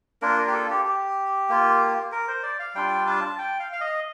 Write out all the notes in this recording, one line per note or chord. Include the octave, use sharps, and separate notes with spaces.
A#3 D4 F4 A#4
A#4
G4
A4
G4
G4
A#3 F4
A#4
C5
D5
F5
G3 D4 F4 G5
A5
G5
F5
F5
D#5